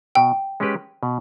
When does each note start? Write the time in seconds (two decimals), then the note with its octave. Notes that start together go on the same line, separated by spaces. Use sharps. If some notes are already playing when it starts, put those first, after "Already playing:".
0.15 B2 G5
0.60 G#3 C#4 G4 B4
1.03 B2